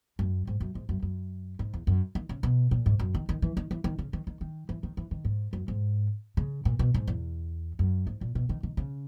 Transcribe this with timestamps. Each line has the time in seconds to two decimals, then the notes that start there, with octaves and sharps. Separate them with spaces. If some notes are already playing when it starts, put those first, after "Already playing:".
0.19 F#2
0.47 G#2
0.60 F#2
0.75 G#2
0.89 F#2
1.02 F#2
1.59 G#2
1.74 E2
1.87 F#2
2.15 D#3
2.29 C#3
2.43 B2
2.71 A#2
2.86 G#2
2.99 F#2
3.15 D#3
3.29 D#3
3.42 E3
3.57 D#3
3.71 E3
3.84 D#3
3.98 C#3
4.13 D#3
4.27 D#3
4.41 D#3
4.69 E3
4.83 D#3
4.97 E3
5.11 D#3
5.25 G#2
5.53 F#2
5.68 G#2
6.37 C#3
6.65 A#2
6.79 B2
6.94 G#2
7.08 E2
7.79 F#2
8.07 G#2
8.21 A#2
8.35 B2
8.49 D#3
8.63 D#3
8.77 C#3